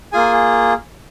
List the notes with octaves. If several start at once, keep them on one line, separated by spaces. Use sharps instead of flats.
A#3 F4 G#4 G#5